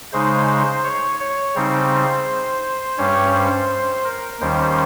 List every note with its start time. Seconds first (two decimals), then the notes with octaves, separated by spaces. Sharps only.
0.13 C#3 G#3 D#4 C5
0.84 C#5
1.20 C#5
1.55 C#3 G3 C4 D#4 C5
2.98 G2 G3 C#4 C#5
3.33 C5
4.05 A#4
4.40 D#2 D#3 G3 C#4 C5